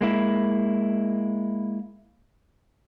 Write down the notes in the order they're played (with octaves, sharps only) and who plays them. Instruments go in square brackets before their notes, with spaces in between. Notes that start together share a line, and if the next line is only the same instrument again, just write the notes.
[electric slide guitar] G#3 A#3 E4